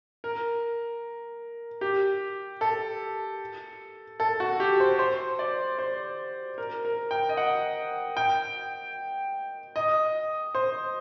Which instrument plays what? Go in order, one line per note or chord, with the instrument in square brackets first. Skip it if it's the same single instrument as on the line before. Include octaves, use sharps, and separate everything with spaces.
[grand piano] A#4
G4
A4
A4
F#4
G4
C5
C5
D5
C5
A#4
A#4
G5
D#5
F#5
G5
D#5
C5